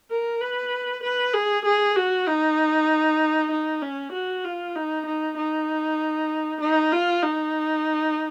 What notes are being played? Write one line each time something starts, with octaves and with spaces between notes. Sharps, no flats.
A#4
B4
B4
G#4
G#4
F#4
D#4
D#4
C#4
F#4
F4
D#4
D#4
D#4
D#4
F4
D#4